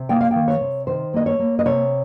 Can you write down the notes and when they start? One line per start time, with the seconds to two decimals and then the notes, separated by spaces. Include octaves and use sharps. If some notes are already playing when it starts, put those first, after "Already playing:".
Already playing: C3
0.09 A#3 G5
0.21 F5
0.31 D#3 G5
0.48 C#5
0.61 C3
0.87 D#3 C5
1.14 A#3 D#5
1.26 C#5
1.39 A#3
1.59 D#5
1.65 C3 C#5